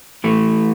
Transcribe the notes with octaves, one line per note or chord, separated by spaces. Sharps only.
E3 A3